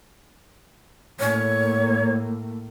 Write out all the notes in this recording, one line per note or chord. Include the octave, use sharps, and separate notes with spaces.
A2 A#3 C#5